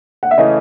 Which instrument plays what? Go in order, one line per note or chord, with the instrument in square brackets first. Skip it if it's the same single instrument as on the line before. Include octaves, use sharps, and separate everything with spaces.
[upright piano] F#5
E5
[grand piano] C#3 E3 A3 C#4 [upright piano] D#5